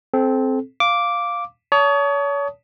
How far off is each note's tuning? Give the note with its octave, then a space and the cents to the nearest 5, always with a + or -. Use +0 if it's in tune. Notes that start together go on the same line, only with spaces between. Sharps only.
C4 +0 A4 -30
F5 +0 D6 -5
C#5 +35 A5 +0 D#6 +0